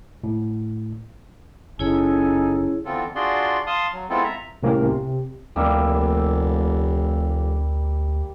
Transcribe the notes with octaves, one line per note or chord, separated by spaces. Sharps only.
A2
F#1 C#4 D#4 E4 G#4 A4 C#5 G#5
D3 E3 B3 C4 F4 A4
D4 F4 F#4 G#4 D5 C6
F5 A5 C6 D#6
F#3
G#3 B3 C4 E4 F4 A4
E5 A#5
C2 A2 A#3 C#4 G4 A#4
C3
F1 D2 G3 A#3 E5